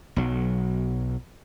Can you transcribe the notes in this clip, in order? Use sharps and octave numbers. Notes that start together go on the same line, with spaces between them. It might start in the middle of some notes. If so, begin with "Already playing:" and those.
B1 F#3